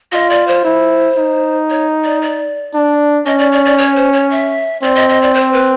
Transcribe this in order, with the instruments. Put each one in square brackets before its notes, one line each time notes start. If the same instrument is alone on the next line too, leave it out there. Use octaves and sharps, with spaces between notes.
[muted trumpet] F4 [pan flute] D#5
[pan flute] D5
C5
[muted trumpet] E4
D#4
[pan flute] C#5
D5
D5
[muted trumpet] D4
[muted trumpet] C#4 [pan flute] D#5
[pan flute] D5
D5
D5
C#5
C5
C#5
E5
[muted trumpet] C4 [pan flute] D5
[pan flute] D#5
D#5
D5
C5
B4